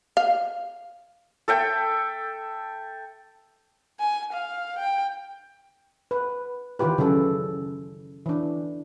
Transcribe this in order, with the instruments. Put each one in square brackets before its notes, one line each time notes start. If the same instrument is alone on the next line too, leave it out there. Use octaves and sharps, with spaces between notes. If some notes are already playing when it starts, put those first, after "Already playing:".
[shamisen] F5
[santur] A4 E5 G5
[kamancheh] G#5
F5
G5
[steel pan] B4
D#3 E3 F4 G4 B4
C#3 F#3 C#4 A4
E3 D4